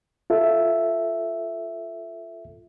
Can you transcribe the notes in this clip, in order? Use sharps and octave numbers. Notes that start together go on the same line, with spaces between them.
F4 A4 E5